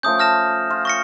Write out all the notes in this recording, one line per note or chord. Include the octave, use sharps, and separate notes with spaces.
F3 A3 C#4 D#6 G6
F6 A#6 E7
F4
C#6 A#6 C#7